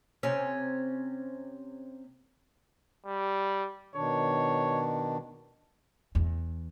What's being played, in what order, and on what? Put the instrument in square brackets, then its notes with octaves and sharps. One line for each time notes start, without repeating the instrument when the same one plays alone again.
[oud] C3 C#4
[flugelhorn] G3
[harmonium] B2 D#3 D4 [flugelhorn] C#5
[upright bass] E2